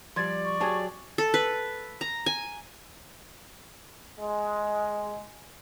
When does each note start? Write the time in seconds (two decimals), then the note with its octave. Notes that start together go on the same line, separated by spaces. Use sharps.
0.16 F3 G3 D5 C6 G#6 A6
0.45 C#6
0.60 F#3 G4 G#4 A5 G#6
1.18 A4
1.34 B4
2.01 A#5
2.26 G#5
4.19 G#3